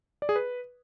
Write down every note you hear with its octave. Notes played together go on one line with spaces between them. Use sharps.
D5
G#4
B4